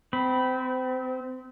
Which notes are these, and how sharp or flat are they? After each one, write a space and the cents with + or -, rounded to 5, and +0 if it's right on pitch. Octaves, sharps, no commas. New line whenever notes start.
C4 -30 B5 +0